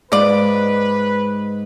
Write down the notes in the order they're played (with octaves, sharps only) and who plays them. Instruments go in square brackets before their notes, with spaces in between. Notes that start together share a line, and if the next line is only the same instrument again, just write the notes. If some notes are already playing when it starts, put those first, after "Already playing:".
[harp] G#2 [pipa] F4 D5 [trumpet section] B4